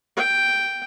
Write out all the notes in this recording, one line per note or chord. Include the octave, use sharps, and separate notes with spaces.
G5